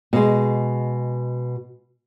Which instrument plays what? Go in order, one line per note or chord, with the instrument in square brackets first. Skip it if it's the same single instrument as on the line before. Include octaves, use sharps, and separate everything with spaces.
[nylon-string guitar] B2 G#3